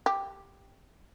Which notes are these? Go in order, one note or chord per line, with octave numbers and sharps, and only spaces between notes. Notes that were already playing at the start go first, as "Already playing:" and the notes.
G4